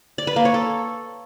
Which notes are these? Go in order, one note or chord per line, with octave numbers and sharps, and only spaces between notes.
D5
B4
A#3
C#5
A4